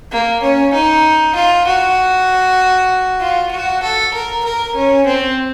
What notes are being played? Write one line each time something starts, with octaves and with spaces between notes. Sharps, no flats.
A#3
C#4
D#4
F4
F#4
F4
F#4
A4
A#4
A#4
C#4
C4